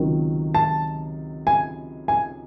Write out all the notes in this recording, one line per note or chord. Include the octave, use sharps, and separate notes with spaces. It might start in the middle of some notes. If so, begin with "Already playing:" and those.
Already playing: C#2 C3 D#3 F#3
A5
G#5
G#5